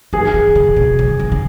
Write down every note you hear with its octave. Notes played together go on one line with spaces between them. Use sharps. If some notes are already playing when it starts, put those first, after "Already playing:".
D#3 G#4
D#3
C#3
B2
C#3
D#3
C#3